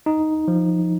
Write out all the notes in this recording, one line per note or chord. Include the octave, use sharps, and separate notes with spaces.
D#4
F3